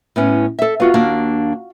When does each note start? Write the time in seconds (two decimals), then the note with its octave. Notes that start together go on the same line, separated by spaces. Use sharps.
0.16 A2 B3 C#4
0.59 A4 E5
0.80 B3 F4 F#4 F5
0.94 D#2 A#3 D4